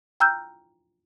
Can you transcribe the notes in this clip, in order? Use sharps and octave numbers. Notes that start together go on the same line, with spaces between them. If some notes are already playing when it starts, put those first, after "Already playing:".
G5 A#5 E6 F6 G6